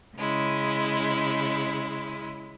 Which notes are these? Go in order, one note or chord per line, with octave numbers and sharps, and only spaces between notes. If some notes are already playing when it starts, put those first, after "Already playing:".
C#3 G#3 E4